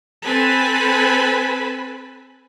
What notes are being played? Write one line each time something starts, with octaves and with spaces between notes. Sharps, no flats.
C4 A4 B4 G#5 A5 B5